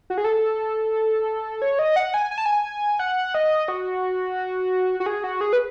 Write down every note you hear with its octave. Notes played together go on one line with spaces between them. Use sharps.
F#4
G#4
A4
C#5
D#5
F#5
G#5
G#5
A5
G#5
F#5
D#5
F#4
F#4
G#4
F#4
G#4
B4